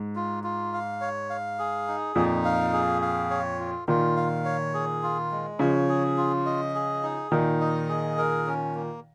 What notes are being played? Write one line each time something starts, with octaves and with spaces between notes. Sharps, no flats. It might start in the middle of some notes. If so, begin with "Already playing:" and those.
Already playing: G#2
F4
F4
F5
C#5
F5
G#4
D#4
F2 A#2 D#4
F5
G#4
F5
C#5
F4
A#2 D#3 F4
F5
C#5
G#4
F4
G#3
C#3 F3 C#5
G#4
F4
D#5
G#4
D#4
A#2 D#3 D#4
D#5
G#4
A#4
C#4
A#3